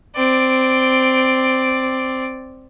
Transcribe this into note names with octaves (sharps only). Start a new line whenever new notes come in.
C4 D5